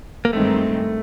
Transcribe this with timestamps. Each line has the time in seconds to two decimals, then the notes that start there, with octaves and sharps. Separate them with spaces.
0.25 A#3
0.33 G2 D#3 G#3 A3 C4